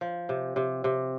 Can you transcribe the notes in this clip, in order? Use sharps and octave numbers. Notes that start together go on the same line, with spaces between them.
F3
C3
C3
C3